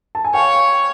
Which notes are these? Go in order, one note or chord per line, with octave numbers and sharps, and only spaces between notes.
A5
G#5
C#5 F5 G5